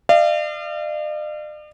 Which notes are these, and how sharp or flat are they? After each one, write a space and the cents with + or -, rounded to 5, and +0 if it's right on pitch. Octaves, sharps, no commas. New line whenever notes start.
D5 +45 F5 -35